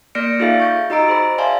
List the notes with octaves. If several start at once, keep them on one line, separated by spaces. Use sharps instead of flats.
A#3 D5 F6 A#6 C#7 D7
D#4 F4 G#4 A4 E5 F5
C#6 G6
D#4 F#4 D#5 A#5 E6 D7
G#4 C5 B5
D5 E5 F5 G#5 A5 C6